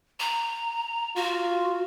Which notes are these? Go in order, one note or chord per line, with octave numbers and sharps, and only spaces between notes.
A#5
F4 F#4